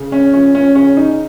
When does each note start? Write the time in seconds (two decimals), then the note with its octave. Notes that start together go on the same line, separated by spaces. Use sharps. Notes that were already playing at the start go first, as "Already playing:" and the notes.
Already playing: C#3
0.12 C#4
0.33 F3 C#4
0.55 C#4
0.75 C#3 C#4
0.97 D#4